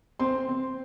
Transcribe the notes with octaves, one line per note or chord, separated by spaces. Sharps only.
C4 C6
C4